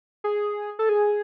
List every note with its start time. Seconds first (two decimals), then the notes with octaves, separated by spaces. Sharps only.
0.24 G#4
0.79 A4
0.89 G#4